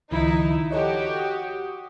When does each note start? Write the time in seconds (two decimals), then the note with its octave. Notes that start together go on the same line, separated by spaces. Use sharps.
0.11 C#2 D#3 F3 D#4 E4
0.71 F#4 G4 A4 C#5 D#5
1.19 D#6